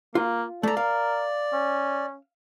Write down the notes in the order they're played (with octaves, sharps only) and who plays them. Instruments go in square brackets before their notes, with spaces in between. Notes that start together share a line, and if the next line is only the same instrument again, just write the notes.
[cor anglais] A#3 [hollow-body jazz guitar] F4
[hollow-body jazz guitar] A3 A#5 [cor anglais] A4 [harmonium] D5
[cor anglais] A#4 [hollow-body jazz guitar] F5
[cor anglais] C#4